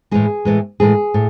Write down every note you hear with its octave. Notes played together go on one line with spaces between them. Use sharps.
A2 E3 G#3 G#4
A2 E3 G#3
A2 E3 G#3 G#4
A2